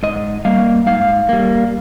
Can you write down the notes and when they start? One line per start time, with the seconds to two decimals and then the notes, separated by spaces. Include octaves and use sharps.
0.03 G#2 D#5
0.45 G3 A#3 F5
0.86 G#2 F5
1.29 G3 A#3